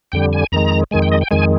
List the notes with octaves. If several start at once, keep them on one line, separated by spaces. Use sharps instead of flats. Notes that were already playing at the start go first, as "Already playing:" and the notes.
F2 D3 G3 G5
G#5
F2 D#3 G#3 A#5
F2 D#3 G#3 G#5
G5
D#5
G5
F2 D#3 G#3 G#5